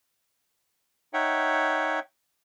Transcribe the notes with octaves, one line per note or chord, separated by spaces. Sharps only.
D#4 C#5 E5 F#5 G5